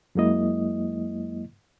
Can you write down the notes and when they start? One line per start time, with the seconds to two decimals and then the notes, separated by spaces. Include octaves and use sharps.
0.15 F#2 F#3 G#3 A#3 E4 D#5